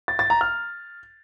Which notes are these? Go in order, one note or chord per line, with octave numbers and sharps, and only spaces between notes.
A6
A6
A#5
F6